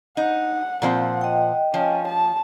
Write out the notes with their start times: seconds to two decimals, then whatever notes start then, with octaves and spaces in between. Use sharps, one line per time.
0.17 D#4 F#5
0.82 A#2 F3 C4 F#5
1.21 D#5 G5
1.74 F3 C#4
2.07 A5